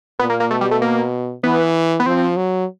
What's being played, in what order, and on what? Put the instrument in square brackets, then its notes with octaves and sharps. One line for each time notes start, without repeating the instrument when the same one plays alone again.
[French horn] A#2 [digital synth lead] B3
[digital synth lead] A#3
A#3
[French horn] B2 [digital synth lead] A3
[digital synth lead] G3
A3
A#3
[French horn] E3 [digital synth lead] B3
[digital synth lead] B3
[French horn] F3 [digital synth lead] C4
[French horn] F#3